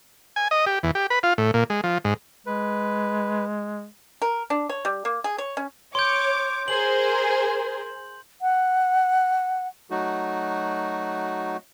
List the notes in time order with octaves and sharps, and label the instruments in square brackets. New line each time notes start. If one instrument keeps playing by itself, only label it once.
[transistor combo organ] G#5
D#5
G4
E2
G4
B4
F4
A2
A#2
G#3
F3
G#2
[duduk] G#3 [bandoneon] B4
[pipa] A#4
D4
C#5
G3
A#3
G#4
C#5
C#4
[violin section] C#5 D6 [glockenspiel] C6 G6
[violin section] G#4 A#4 C5 [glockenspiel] F#7
[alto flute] F#5
[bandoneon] F#3 A3 D#4 F#4